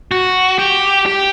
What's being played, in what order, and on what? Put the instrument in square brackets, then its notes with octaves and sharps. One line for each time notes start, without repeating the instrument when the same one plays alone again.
[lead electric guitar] F#4
G4
G4